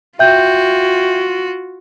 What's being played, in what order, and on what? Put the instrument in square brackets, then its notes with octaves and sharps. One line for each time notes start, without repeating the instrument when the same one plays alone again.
[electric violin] F4 F#4 [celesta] E5 G5 G6